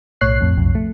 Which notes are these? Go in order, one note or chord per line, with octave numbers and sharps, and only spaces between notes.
B1 A2 C#5 F#6 C7
F2 A2
B1 F2
A3